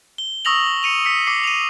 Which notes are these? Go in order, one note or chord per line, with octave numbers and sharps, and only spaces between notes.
G7
C#6 D#6 E6 A#6 F7 F#7
C#7 D#7 F7
D#6 B6 C#7
D6 C7 C#7
D#7 F7